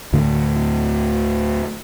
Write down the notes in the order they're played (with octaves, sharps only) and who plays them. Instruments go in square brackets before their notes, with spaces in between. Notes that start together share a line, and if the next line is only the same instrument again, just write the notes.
[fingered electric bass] D2 A2 D3 A3